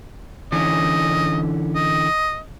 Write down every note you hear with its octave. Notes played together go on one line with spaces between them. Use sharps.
D3 E3 C#4 D#5
D#5